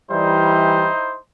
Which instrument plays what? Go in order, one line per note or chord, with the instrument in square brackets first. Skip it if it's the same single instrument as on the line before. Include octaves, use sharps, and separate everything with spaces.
[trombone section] E3 G3 [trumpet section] D#4 E4 C5